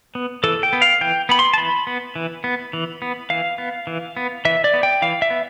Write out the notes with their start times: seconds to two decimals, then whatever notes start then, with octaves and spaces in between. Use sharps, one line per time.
0.15 B3
0.44 E3 A4
0.63 G5
0.73 B3
0.82 F5
1.01 E3 G5
1.29 B3 B5
1.39 C6
1.54 A5
1.58 E3 B5
1.87 B3
2.16 E3
2.44 B3
2.73 E3
3.02 B3
3.30 E3 F5
3.58 B3
3.87 E3
4.17 B3
4.45 E3 E5
4.64 D5
4.74 B3
4.83 G5
5.02 E3 F5
5.22 E5
5.30 B3